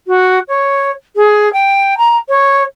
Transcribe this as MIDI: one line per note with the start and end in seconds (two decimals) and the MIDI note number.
0.07 0.39 66
0.48 0.91 73
1.16 1.51 68
1.53 1.97 79
1.98 2.17 82
2.29 2.63 73